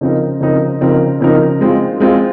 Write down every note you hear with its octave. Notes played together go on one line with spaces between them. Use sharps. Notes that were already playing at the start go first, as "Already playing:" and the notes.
C#3 F3 C4 D#4 A#4
C#3 F3 C4 D#4 A#4
C#3 F3 C4 D#4 A#4
C#3 F3 C4 D#4 A#4
G#3 C4 F4
G#3 C4 F4